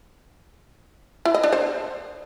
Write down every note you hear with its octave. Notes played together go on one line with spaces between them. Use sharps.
E4
D#5
D4
C5